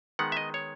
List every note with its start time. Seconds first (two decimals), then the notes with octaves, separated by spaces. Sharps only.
0.19 D#3 G#3 B3 F#5
0.32 E5
0.37 D#5
0.54 C#5